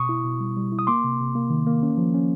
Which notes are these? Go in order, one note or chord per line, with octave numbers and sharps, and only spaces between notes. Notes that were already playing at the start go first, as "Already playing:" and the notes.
Already playing: B2 C#6 D#6
E4
B2
G3
G3
E4
D#6
A#3 C6 D6
C3
C3
A#3
D#3
A#3
C#4
F3
C#4